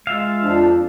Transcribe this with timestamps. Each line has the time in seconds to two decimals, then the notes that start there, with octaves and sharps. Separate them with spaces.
0.07 G#3 F4 E5 F5
0.42 F2 F3 D4